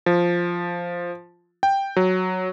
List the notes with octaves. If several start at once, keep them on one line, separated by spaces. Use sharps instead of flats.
F3
G5
F#3